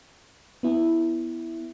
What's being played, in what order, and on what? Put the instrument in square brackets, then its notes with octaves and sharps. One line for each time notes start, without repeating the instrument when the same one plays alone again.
[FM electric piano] B3 E4